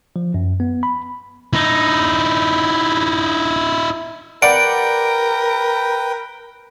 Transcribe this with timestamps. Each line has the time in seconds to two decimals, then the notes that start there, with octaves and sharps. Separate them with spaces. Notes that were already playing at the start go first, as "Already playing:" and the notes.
0.16 F3
0.34 F#2
0.60 B3
0.83 B5
1.53 D#4 E4
4.42 A#4 B4 D5 F#5 G5 D7